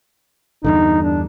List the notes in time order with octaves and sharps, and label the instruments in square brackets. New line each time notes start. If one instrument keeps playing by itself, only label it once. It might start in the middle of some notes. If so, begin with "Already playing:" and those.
[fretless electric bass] E2 G2 D3 [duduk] D#4
[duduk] D4